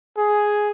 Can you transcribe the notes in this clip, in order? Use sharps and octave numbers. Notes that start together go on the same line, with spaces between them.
G#4